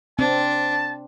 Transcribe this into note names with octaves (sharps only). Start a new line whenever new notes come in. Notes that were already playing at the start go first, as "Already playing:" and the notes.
C4 D4 A5